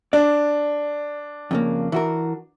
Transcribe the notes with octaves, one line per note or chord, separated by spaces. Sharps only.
D4 D5
F2 C#3 A#3
E3 F#4 A#4